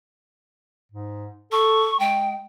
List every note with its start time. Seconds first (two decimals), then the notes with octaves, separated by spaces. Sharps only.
0.92 G#2
1.52 A4 C#6
2.00 G#3 G5